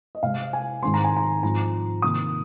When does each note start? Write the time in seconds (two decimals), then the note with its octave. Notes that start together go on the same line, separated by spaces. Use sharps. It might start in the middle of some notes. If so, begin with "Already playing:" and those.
0.15 D#5
0.23 C3 G#3 C4 F5
0.53 G#5
0.83 G#2 D#3 G#3 C4 C6
0.94 A#5
1.04 G#5
1.17 A#5
1.42 G#2 F3 C4 A#5
2.02 C3 D#3 A#3 D#6